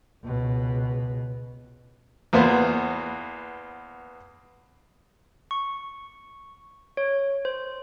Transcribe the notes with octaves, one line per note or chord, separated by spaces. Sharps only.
C#2 B2
E2 A#3 B3 B4 C5
C#6
C#5
C5